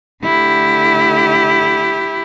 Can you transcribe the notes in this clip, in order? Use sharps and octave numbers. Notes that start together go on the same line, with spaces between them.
D3 A3 E4 G4